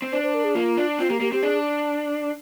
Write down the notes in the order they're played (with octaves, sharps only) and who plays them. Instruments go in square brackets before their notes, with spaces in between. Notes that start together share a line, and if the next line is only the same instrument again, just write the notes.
[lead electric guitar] C4
[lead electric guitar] D4 [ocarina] C5
[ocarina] C5
A#4
G#4
[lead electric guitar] A#3 [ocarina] F4
[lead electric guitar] D4
[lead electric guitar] C4 [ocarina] F4
[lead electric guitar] A#3 [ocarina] G4
[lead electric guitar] A#3 [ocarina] G4
[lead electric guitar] C4 [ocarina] G4
[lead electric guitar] D4 [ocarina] G#4